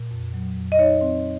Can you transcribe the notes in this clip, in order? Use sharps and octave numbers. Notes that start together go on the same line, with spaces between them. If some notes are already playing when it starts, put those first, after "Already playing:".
Already playing: A#2
F2
F#3
F2
D#5
D#4 C#5
C4